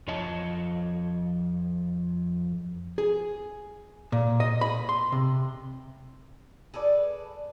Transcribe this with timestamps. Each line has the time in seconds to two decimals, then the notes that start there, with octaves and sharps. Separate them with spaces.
0.08 F2 F3 C#5 D#5 A5
2.98 G#4
4.12 A#2
4.40 D#5
4.61 B5
4.89 C6
5.12 C3
6.74 G#4 A4 B4 D5